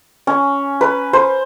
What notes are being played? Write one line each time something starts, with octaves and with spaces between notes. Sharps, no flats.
C#4
B4
C5